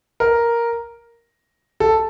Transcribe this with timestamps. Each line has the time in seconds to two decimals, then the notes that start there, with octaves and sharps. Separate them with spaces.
0.20 A#4
1.80 A4